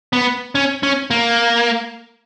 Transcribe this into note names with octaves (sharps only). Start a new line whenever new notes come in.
B3
C#4
C#4
A#3